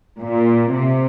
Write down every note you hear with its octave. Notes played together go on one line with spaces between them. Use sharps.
A#2
C3